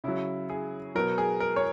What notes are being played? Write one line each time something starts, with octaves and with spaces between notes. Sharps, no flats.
C#3 F#3 E4
G#4
B2 F#3 A#4
G#4
A#4
C#5